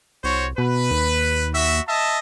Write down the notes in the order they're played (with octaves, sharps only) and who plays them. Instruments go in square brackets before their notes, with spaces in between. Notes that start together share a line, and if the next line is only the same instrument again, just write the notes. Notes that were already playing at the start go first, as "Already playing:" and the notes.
[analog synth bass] C2 [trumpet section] F#4 C5 C#5
[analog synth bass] B2 [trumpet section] B4
[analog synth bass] D#2
[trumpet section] F#4 E5
D#5 E5 A5